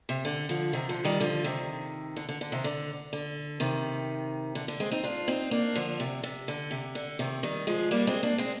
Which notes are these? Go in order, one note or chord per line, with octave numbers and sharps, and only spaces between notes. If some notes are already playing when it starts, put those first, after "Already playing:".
C3
D3
D3 F3
C3 D#3
D3 F3
D#3 G3
D3 F3
C3 D#3
D3
D3
D3
C3 D#3
D3
D3
C3 D#3
D3
D3
G#3 C4
C4 D#4
D4 F4
C4 D#4
A#3 D4
D3 F3
C3
C3
D3
C3
D3
C3 D#3
D#3 G3
F3 G#3
G3 A#3
G#3 C4
A#3 D4
G#3 C4